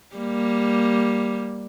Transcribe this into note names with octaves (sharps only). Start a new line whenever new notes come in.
G3 A#3